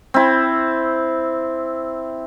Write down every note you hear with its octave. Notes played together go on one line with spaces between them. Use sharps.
C4 E4